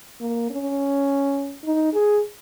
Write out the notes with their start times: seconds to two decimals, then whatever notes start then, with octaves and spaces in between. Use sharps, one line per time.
0.20 A#3
0.50 C#4
1.64 D#4
1.93 G#4